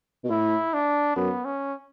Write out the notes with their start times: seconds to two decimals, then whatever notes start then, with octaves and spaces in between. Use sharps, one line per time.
0.24 B2
0.30 A2 E4
0.74 D4
1.16 F#2 B3
1.45 C#4